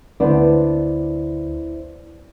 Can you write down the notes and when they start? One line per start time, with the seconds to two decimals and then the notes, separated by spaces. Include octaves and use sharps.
0.20 D2 B3 D4 E4 C5